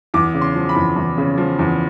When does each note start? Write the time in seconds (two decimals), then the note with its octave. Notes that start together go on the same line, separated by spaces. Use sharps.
0.14 E2 D6
0.34 C#3
0.41 C6
0.55 F3
0.69 B5
0.76 E2
0.96 E2
1.18 C#3
1.38 F3
1.59 E2